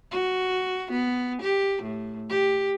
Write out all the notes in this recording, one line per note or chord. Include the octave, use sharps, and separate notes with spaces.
F#4
B3
G4
A2
G4